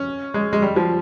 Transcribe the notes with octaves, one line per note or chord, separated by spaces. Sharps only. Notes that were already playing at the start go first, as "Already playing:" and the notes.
Already playing: C#4
G#3
G#3
G3
F3